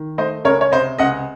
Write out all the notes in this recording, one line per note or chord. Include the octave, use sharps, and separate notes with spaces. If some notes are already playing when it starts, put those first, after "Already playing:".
Already playing: D#3
A3 C5 D#5
C#2 A#4 C#5
C#5
C3 C5 D#5
C#2 D#5 F#5